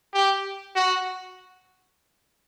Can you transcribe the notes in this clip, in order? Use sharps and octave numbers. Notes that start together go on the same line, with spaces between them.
G4
F#4